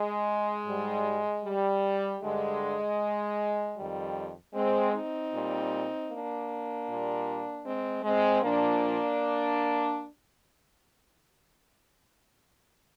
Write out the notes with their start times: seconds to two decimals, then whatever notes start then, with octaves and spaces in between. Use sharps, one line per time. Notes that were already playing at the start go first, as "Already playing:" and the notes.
Already playing: G#3
0.67 G#2 G3
1.44 G3
2.21 G2 D3 G3 G#3
3.76 F2 D#3 G3
4.54 G#3 C4
4.93 C4 D#4
5.32 A#2 G3
6.10 A#3 D4
6.88 A#2 G3
7.64 G#3 C4
8.03 G#3 C4
8.42 A#2 F3 A#3 D4